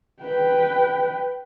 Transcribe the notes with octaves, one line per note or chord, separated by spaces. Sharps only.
B4 G5